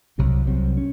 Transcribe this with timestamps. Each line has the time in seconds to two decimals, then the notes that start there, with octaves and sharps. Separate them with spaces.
0.18 C2 C3 F#3 C4
0.47 C2 C3 F#3 C4
0.77 C#4